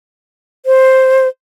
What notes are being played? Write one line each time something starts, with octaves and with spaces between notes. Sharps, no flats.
C5